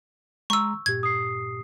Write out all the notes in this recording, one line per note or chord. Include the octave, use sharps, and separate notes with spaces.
G#3 A#5 C6 C#6 E6
G2 A#2 G4 G#6
D#6 C7